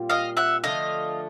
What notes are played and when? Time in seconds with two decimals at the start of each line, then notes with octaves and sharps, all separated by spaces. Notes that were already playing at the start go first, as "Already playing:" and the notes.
Already playing: A#2 G3 C4 F4
0.10 D#5 F5
0.37 E5 F#5
0.64 D3 F3 A3 D#5 F5